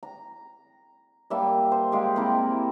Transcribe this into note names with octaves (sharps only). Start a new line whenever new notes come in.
A#5
G3 A#3 E5 A5
C5
G#3 G4 F5
C3 A#3 E4 A#4